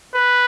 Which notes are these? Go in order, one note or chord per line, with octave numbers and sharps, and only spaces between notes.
B4